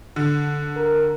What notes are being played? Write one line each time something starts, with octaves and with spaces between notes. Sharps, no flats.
D3
A#4